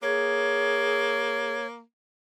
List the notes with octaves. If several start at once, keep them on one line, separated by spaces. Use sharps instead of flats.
A#3 G#4 C#5